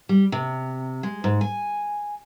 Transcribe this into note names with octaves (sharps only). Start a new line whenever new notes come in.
G3
C3
G#3
G#2
G#5